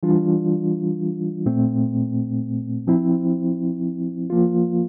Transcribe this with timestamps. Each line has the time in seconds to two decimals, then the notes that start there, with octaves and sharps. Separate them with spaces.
0.03 E3 G3 D4 F4
1.46 A#2 A3 C4
2.87 F3 C4 E4
4.30 F3 A#3 F4